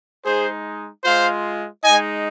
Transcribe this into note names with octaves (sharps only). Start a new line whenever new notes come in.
G#3 D#4 G#4 C5
G#3 F4 C5 F5
G#3 D#4 D#5 G#5